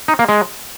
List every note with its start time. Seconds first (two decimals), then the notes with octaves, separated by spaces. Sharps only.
0.08 D#4
0.19 A#3
0.29 G#3